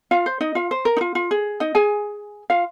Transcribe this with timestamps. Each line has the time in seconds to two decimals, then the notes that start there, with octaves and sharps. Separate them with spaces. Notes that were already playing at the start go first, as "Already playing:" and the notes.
0.11 F4 F5
0.26 C5
0.41 D#4 D#5
0.55 F4 F5
0.71 C5
0.85 A#4
0.97 D#4
1.01 F4
1.15 F4
1.31 G#4
1.60 D#4 D#5
1.75 G#4 G#5
2.50 F4 F5